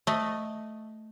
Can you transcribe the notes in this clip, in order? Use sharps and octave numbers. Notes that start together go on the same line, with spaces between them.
A3 D#5